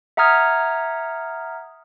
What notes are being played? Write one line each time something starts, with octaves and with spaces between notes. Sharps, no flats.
E5 F#5 A#5 D#6 F6 G#6